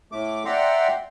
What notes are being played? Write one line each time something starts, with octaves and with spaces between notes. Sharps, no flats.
A2 A3 D6
D5 E5 F#5 G5 A#5 C6